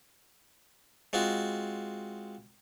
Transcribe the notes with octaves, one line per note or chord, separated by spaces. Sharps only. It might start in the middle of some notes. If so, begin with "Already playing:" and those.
G#3 C4 F4 F#4